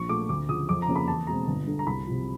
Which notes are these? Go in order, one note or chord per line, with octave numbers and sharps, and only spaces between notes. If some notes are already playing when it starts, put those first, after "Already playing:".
Already playing: A#1 C#6
A#2 F3 A3 D6
D2 D6
C#3 F3 D#6
F2 D6
A#5
C#3 F3 A#3 C#4
B5
E2 A5
B2 G#3 C4 A#5
G1
G2 D3
A#5
C2 B5
C3 F3